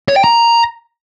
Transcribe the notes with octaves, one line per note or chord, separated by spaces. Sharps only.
C#5
G5
A#5